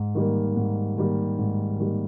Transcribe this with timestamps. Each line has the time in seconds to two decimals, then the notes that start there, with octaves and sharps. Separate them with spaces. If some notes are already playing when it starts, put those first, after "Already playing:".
Already playing: G#2
0.15 D#3 G3 A#3
0.56 G#2
0.98 D#3 G3 A#3
1.39 G#2
1.80 D#3 G3 A#3